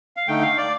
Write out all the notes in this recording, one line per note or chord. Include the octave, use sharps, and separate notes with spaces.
F5
D3 A3 D#4 G5
F5
D5